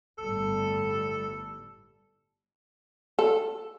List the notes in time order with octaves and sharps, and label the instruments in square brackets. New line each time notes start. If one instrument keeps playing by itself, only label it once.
[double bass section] G1 A2 G3 [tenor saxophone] A4
[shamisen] A4